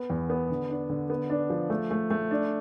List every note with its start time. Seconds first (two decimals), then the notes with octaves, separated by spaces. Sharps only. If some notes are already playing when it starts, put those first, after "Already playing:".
Already playing: B3
0.10 E2
0.30 B3
0.50 D3
0.70 D4
0.89 D3
1.10 B3
1.30 D4
1.50 F3
1.70 A3
1.91 A3
2.10 A3
2.31 D4